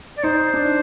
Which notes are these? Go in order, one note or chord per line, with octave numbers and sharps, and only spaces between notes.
D5
D#4 C5
D4